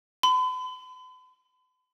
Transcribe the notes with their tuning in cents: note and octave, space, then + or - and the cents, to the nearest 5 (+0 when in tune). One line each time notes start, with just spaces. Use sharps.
B5 +45